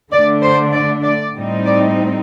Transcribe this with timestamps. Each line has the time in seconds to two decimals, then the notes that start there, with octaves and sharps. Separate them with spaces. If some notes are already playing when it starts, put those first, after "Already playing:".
0.12 D3 A3 D4 D5
0.42 C5
0.73 D5
1.03 D5
1.35 A2 G3 C4 D#4
1.65 D5